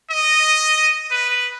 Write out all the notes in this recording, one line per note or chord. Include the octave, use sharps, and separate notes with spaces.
D#5
B4